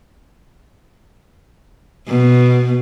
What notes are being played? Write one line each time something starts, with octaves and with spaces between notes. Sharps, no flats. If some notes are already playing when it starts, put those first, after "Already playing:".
B2